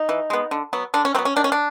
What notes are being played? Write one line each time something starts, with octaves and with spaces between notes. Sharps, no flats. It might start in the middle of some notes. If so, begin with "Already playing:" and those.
Already playing: D#4
E3
G#3 B3
D3
F#3 B3
D3 D4
C#4
F#3 B3 C4
C#4
D#3 D4
C#4
D4